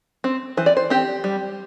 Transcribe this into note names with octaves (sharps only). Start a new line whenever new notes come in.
C4
E3 C5
D5
C5
C4 G4
G3